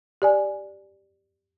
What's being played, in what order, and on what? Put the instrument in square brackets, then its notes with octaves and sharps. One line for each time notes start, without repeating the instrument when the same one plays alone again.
[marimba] G4 D5 G#5